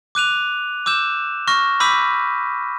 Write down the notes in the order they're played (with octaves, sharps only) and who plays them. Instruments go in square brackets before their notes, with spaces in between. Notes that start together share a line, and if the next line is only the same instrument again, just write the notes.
[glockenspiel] D6 F#6 D#7 F7
D6 E6 G6 E7
C#6 F6 A#6
B5 D6 E6 G6 B6 D#7